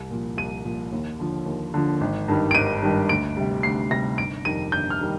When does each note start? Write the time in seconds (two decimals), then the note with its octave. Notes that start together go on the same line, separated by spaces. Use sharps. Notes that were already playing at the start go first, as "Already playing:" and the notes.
Already playing: C2
0.10 A#2 F3
0.37 C2 D#7
0.65 A#2 F3
0.92 D#2
1.19 D3 F3
1.46 D#2
1.74 D3 F3
2.01 G#1
2.28 G2 D#3 G3
2.51 D7
2.55 G#1 D#7
2.83 G2 D#3 G3
3.09 D2 D7
3.37 C3 G3
3.63 D2 C7
3.91 C3 G3 A#6
4.18 G1 D7
4.45 F2 D#3 G3 D#7
4.72 G1 G6
4.90 F6
5.01 D#3 G3